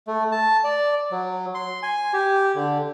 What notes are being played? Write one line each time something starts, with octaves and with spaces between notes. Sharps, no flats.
A3
A5
D5
F#3
C6
G#5
G4
D3